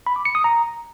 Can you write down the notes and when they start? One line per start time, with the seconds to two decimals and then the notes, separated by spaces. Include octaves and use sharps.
0.07 B5
0.16 D6
0.25 C#7
0.35 D#6
0.44 A#5